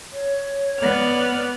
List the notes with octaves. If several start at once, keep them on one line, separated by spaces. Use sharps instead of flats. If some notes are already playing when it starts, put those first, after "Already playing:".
C#5
B3 D5 F6